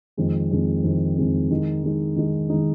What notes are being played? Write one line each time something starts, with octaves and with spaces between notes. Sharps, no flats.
F2 D#3 G#3 C4
F2 D#3 G#3 C4
F2 D#3 G#3 C4
F2 D#3 G#3 C4
D#3 G#3 D#4
D#3 G#3 D#4
D#3 G#3 D#4
D#3 G#3 D#4